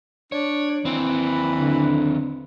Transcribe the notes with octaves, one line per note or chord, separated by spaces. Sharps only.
D4 C#5
D#2 E3 C4 B4
D3